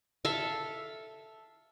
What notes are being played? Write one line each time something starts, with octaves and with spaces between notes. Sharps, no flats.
A4 E5 F5